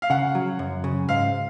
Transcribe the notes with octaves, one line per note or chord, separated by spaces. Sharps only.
F5
C#3 F#5
F#3
F#2
C#3
G#2 F5